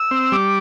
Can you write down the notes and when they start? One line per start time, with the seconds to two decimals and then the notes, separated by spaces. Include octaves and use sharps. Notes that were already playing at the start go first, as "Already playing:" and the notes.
Already playing: E6
0.11 C4
0.32 G3 D6